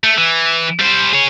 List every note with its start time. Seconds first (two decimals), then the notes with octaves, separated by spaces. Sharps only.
0.04 A3
0.18 E3
0.80 G3 C5
1.13 G#4 C#5